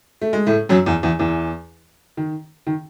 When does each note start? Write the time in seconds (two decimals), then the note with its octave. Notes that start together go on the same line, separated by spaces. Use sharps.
0.21 A3
0.33 G#3
0.46 A2 A3
0.69 F#2 F#3
0.86 E2 E3
1.03 E2 E3
1.19 E2 E3
2.17 D#3
2.67 D#3